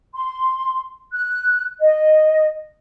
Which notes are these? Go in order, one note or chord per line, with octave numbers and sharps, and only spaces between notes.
C6
F#6
D#5